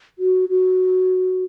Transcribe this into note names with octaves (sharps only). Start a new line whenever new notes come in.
F#4
F#4